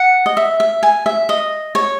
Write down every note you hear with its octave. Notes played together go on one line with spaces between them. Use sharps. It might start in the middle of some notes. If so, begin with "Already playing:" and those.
Already playing: F#5
D#5
E5
E5
G#5
E5
D#5
C#5